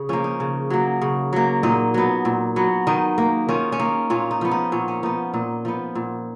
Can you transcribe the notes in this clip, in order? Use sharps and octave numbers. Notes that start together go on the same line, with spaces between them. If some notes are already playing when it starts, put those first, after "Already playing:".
Already playing: C#3 G#4
F3 A#3 C#4
D#4
C#3
F#3 A#3
C#3
F#3 A#3
A#2 D#4
F#3 B3
A#2
F#3 B3
D#3 D#4
A#3
D#3 C#4 F4
C#4
A#3 D#4
A#2 C#4 F4
D#4
F3 B3
D#4
A#2 C#4
C#4
F3 B3 D#4
A#2 D#4
F3 B3
A#2